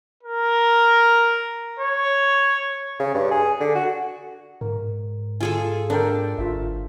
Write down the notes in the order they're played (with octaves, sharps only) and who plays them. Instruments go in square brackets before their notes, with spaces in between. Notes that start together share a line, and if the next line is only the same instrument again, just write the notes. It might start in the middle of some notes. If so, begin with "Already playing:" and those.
[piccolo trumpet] A#4
C#5
[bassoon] C#3
G2
G#4
D3
F#4
[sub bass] G#2 [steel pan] A#4
[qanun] F4 G#4 A4 [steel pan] G#5
[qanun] D4 [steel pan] A4 A#4 G5
[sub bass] G1 [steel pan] F4 E5